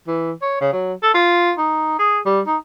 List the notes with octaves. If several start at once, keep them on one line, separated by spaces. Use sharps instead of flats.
E3
C#5
C#3
F#3
A4
F4
D#4
G#4
G3
D#4